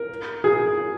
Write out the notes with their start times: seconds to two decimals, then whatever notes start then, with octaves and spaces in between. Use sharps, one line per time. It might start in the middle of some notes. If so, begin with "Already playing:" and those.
Already playing: A#4
0.44 G#4